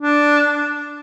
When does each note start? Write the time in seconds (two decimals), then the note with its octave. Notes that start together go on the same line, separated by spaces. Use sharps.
0.02 D4